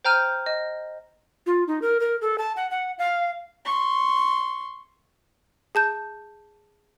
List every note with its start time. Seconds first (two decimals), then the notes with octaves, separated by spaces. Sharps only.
0.05 C5 G5 A#5 F6 G6 D#7
0.46 D#5
1.46 F4
1.67 D#4
1.82 A#4
2.00 A#4
2.21 A4
2.38 A5
2.56 F#5
2.71 F#5
2.98 F5
3.66 C6 C#6
5.75 G#4 A5 G6